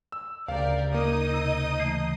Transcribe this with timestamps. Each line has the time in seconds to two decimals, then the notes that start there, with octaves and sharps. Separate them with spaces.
0.12 E6
0.48 D2 C#3 G4 A#4 D5 F5
0.94 A#3 D#4 D#5 D#6
1.34 C3
1.80 E3 A3